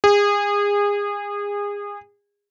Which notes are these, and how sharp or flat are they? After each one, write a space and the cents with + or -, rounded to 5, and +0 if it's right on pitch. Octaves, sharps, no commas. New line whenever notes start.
G#4 -30